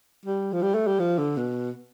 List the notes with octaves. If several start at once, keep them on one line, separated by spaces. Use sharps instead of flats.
G3
F3
G3
A3
G3
F3
D3
B2